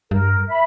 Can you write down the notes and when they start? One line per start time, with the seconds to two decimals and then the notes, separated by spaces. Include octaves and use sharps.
0.11 G2 A#4
0.48 E5 B5